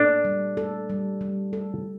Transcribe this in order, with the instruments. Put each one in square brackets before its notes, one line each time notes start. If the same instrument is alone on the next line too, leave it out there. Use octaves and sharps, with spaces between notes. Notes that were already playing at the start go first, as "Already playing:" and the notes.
Already playing: [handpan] A#2 A4 [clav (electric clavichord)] D4
[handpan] G3
A4
G3
G3
A4